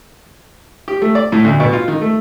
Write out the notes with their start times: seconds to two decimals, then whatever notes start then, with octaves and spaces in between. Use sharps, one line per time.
0.88 G4
1.02 A3
1.15 D5
1.32 A2
1.45 D2
1.60 B2
1.73 F4
1.88 D#3
2.01 A3